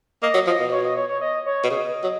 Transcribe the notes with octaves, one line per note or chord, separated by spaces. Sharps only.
A#3 D#5
F#3
F3 D#5
B2
C#5
D#5
C#5
C#5
D#5
C#5
B2
C#3 D#5
F#3